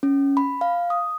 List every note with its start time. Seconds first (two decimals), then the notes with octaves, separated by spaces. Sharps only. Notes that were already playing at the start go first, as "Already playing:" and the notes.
0.03 C#4
0.37 B5
0.61 F5
0.90 D#6